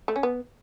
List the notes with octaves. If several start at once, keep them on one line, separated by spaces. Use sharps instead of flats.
A3
C#4
B3